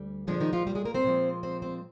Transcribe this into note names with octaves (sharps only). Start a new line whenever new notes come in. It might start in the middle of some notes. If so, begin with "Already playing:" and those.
Already playing: D2 G3
A#2 D3 F3 G#3 D4
D#3 D#4
F3 F4
G3 G4
G#3 G#4
A#3 A#4
C4 C5
A#2 F3 G#3
C4 C5
C4 C5